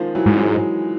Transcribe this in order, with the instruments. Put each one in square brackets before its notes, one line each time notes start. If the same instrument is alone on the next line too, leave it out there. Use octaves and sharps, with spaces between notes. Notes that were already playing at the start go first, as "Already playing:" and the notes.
Already playing: [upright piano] D#3 F3 G#3
E3 F#3
[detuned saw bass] G#2
[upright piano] F#3 G#3